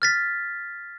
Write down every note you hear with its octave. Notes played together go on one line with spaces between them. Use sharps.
F6 A6 B6